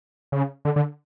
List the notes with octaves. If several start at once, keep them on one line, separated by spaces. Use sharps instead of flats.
C#3
D3
D3